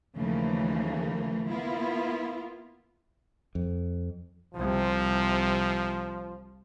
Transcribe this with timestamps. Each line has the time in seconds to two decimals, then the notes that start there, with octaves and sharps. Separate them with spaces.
0.15 D#2 C#3 E3 F3 A3 A#3
1.49 A#3 B3 E4 F4
3.55 F2
4.54 C2 C3 F3